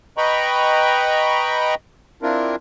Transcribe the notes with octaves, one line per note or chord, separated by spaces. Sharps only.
B4 D#5 G5 A#5 B5 C#6
C4 D4 E4 F4 A#4